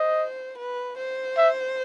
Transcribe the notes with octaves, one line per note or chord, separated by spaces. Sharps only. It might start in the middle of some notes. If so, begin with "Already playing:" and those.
Already playing: C5 D#5
B4
C5
E5